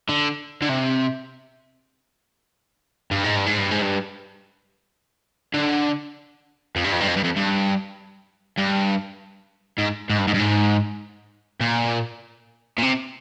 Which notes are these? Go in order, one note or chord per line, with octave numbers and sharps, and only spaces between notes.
D3
D3
C3
G2
G#2
G2
G#2
G2
G#2
G2
D3
F2
G2
F2
G2
F2
G2
F2
G2
G2
G#2
G#2
G2
G#2
G2
G#2
A#2
A#2
C3